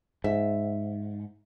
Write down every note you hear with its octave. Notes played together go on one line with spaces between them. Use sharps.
G#2 E5